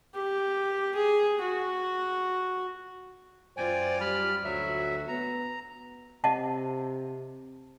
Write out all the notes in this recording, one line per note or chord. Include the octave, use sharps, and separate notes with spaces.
G4
G#4
F#4
F#2 F4 C5 D5 G5 G#5
G3 B5 F6
D2 F#3 F#4 E5
B3 A#5
C3 D#5 F#5 A5